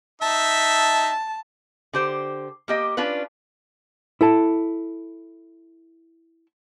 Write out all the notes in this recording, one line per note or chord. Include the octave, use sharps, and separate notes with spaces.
D#4 E5 A5
D3 G4 C5
A#3 G4 D#5
C#4 D4 F4 B4
E4 A4 A5